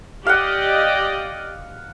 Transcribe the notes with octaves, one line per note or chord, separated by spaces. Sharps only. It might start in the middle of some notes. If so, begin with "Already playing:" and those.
G4 D5 D#5 F5 F#5